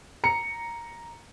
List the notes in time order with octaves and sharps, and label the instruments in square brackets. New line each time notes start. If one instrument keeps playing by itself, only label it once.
[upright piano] A#5 C#7